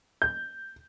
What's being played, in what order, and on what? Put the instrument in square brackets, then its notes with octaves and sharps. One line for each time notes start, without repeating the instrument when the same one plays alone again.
[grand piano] G6